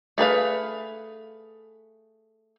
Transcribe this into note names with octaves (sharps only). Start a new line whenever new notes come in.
A3 G#4 B4 F5